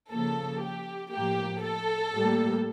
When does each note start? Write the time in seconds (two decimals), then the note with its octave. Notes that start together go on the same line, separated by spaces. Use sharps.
0.10 C#3 F3 A#3 A4
0.62 G4
1.12 A2 F3 A#3 G4
1.63 A4
2.13 A2 G3 A#3